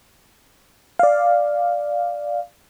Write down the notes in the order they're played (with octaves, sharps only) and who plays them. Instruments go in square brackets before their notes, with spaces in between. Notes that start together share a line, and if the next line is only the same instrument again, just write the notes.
[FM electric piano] D5 F5